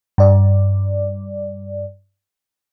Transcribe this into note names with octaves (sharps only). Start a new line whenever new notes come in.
G2 D5